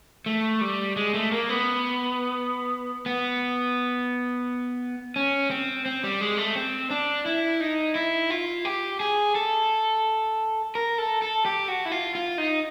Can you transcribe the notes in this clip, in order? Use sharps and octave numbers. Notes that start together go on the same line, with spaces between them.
A3
G3
G#3
A3
A#3
B3
B3
C#4
C4
C4
G3
G#3
A3
C4
D4
E4
D#4
E4
F4
G4
G#4
A4
A#4
A4
A4
G4
F#4
E4
F4
F4
D#4